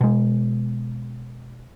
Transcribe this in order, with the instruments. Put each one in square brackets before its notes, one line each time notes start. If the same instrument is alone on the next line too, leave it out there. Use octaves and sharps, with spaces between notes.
[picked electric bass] B2 G#3